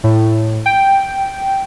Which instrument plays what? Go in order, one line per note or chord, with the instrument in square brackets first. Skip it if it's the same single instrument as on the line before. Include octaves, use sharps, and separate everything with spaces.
[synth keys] A2
G5